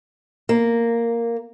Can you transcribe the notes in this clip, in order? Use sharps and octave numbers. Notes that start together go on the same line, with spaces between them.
A#3